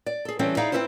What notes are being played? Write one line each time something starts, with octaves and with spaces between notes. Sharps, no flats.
D5
G#4 A4
E3 G3 C4 C#4 A4
D#4 E4 G#4 D5 E5 F5
C4 C#4 E4 A4 B4 C5